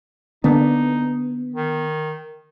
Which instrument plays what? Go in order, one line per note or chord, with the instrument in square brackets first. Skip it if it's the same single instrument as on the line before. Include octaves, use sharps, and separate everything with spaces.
[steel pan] D3 A#3 D4 [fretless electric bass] B3 [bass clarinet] D#4
[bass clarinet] D#3